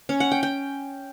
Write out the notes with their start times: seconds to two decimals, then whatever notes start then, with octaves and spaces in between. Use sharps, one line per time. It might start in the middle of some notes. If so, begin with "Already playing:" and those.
0.09 C#4
0.20 F#5
0.32 G5
0.43 G5